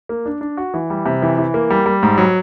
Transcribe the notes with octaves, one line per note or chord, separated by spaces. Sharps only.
A#3
D4
D4
F#4
E3
G3
C3
E3
E3
A#3
G3
G3
G#2
F#3